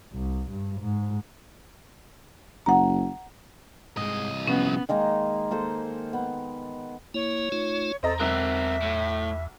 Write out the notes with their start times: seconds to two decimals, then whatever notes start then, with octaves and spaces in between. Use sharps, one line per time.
0.13 C2
0.51 G2
0.81 G#2
2.66 F#1 F#5 A#5
3.97 C2 G#2 G#3 D#5
4.47 C3 F3 B3 C#4 B4
4.89 D#3 G#3 A#3 D#4
5.51 A#3 A4 C5 D#5
6.13 B3
7.14 A#3 E4 C#5
7.52 A3 D#4 F4
8.03 E2 C4 A4 D#5 A#5
8.20 B1 C4 A#4 E5 E6 F#6
8.82 A2